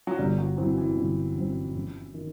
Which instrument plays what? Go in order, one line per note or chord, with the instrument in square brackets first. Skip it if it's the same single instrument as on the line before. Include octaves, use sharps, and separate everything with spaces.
[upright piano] F#3
[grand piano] G1 [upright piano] G3
[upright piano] F#3
[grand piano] F#2 F#3 C4 [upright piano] E3
[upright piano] E3
[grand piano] G1
F#2 F#3 C4
F#2
D#3